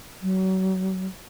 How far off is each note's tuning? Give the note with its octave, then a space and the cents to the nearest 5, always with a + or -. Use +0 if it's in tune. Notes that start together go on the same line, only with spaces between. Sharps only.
F#3 +30